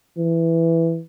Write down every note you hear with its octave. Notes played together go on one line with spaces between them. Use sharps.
E3